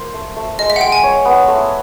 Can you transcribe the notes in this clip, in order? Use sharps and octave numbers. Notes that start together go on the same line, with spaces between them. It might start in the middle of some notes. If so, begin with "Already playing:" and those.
Already playing: A#3 C5
A3
A3
G#3 D#5
E5
F#5
G#3 G5
G#5
C#5
B3
A3